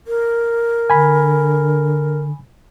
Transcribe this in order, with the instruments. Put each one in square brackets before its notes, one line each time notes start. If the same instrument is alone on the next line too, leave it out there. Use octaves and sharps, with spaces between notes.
[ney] A#4
[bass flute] D3 [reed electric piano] G#5 B5